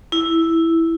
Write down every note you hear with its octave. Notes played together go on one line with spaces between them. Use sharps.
E4